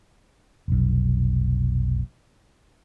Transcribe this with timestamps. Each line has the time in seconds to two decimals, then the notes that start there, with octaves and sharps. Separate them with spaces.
0.68 F1 B1